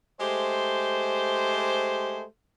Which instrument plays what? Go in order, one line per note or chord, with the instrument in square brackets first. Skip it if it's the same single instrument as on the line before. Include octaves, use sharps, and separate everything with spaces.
[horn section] G#3 A3 G4 C5